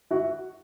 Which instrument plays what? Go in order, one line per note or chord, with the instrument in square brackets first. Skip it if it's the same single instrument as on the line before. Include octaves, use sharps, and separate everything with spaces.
[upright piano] E4 F#4